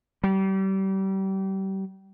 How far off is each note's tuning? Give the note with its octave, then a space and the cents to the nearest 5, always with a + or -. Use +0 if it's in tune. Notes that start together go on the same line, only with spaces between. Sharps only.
G3 -30